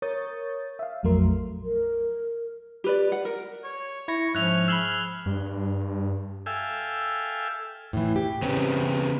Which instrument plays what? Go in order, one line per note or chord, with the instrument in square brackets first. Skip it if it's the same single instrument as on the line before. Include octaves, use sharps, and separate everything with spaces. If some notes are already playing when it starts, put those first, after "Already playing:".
[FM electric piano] A#4 C#5 C#6 D#6 G6 A6
E5 F5
A#1 F2 F#3 A3 A#4 C6
[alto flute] A#4
[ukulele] G4 B4 D5
F#5
A#4
[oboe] C#5
[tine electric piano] E4 G#6 A#6 [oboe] C#6
[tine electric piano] G#2 E5 G6 [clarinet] F3 [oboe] C#4 [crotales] F#6 F7
[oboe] G#4 [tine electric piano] B5 E6 [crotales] F6 F#7 G7
[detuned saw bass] G2
[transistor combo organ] A4 E5 F5 G5 G#5
[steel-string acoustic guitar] A2 E3
G4
[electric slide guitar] C#3 B3 [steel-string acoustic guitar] C4